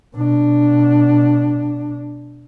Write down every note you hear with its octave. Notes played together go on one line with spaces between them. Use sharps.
B2 D4